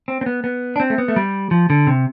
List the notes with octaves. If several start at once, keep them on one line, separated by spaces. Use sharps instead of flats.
C4
C4
B3
B3
D4
C4
A3
B3
A3
G3
F3
D3
C3